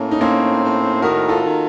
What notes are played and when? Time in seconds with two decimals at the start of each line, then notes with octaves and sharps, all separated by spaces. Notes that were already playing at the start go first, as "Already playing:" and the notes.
Already playing: A2 A#3 C#4
0.11 D#4
0.21 A#3 C4 C#4
0.62 A2
1.01 D#3 F#4 A#4
1.29 F4 A4
1.43 D#3